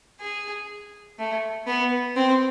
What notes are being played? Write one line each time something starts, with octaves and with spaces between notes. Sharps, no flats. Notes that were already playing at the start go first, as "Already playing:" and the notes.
G#4
A3
B3
C4